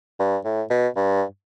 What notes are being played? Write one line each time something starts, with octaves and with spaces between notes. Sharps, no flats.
G2
A2
B2
G2